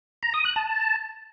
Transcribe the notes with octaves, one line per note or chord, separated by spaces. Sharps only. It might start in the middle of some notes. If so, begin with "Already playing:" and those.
A#5
D#6
F#6
A5